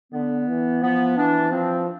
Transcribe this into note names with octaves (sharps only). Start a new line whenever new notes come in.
D3 B3
E3
F3 B3
E3 D4
F3 C4